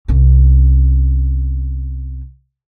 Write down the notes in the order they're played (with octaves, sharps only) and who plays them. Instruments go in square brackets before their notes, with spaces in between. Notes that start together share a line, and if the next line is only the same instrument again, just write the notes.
[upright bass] C2 C#4